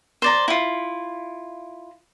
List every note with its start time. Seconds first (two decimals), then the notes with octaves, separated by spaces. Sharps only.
0.22 C5 D5 A#5
0.48 E4 F4